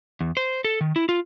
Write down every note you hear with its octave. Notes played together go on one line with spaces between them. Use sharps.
E2
C5
A4
D#3
E4
F4